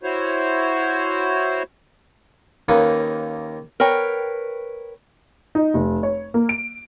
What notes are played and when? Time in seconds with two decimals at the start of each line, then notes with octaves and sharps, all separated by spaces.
0.03 E4 F#4 C5 C#5
2.68 D#2 A#3 C#4 D#4 B4
3.80 A#4 B4 C#5 G5
5.55 D#4
5.74 F1
6.03 C#5
6.34 A#3
6.49 D7